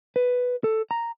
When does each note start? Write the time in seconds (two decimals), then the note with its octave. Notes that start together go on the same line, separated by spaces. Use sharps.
0.16 B4
0.64 A4
0.91 A#5